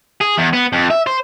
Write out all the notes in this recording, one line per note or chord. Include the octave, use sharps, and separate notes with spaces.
G#4
E2
B3
F2
E5
C5